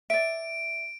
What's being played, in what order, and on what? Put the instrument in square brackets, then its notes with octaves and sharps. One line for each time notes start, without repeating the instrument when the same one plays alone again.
[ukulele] D5 E5 [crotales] D7